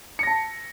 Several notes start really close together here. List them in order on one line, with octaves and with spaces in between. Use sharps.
C#7 A#6 A5